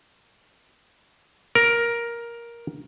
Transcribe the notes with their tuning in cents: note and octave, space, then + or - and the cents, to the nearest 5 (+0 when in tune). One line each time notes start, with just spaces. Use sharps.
A#4 +10